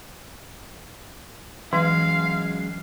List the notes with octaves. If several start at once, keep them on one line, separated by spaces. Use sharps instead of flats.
F#2 E3 G#3 F5